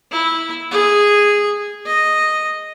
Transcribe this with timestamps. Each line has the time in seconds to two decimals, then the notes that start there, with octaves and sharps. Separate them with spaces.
0.11 E4
0.71 G#4
1.86 D#5